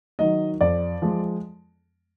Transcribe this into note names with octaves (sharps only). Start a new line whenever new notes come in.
D#3 F#3 D#5
F2 D5
F3 G#3